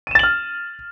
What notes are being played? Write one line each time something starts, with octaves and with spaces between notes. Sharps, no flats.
F6 A6 D#7 E7 F#7